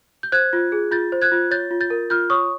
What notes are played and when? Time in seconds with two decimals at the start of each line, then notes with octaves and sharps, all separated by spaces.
0.23 G6
0.32 C5 F#6 G#6
0.53 F4
0.72 G#4
0.91 F4 G6 A6
1.12 C5
1.22 F#6 G#6
1.32 F4
1.51 C#5 G6 A6
1.71 F4
1.81 G6 A6
1.90 A#4
2.10 F4 F6 G6
2.30 C#5 C#6 D#6